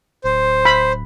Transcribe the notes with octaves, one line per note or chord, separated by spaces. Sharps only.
D1 C5
B5